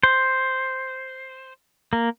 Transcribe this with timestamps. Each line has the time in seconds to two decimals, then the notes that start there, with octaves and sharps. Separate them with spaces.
0.03 C5
1.93 A#3